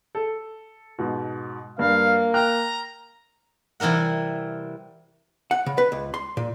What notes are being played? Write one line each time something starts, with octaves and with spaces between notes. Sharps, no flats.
A4
G#2 B2
G2 A#3 F5
G5 A#5 F6 F#6
C3 E3 G3 A#4 F#5
F#5
C#3
B4
C#2
C6
A#2